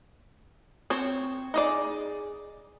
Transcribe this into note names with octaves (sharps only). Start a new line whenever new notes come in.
C4 C5 C#5
D#4 G#4 D5